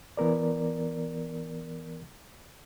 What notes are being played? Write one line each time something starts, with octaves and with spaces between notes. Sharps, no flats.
E3 B3 A#4 D5